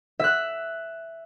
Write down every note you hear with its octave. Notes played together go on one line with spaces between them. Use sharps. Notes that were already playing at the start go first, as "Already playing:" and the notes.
E5 F#6